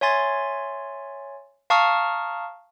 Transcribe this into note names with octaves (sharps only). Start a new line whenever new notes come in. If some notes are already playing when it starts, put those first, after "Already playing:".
C#5 E5 G#5 C6 A6
F5 A5 A#5 C#6 D#6 F6